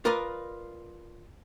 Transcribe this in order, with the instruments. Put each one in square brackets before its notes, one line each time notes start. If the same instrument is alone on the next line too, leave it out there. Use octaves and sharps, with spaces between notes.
[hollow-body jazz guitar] F4 A#4 B4 D5 D#5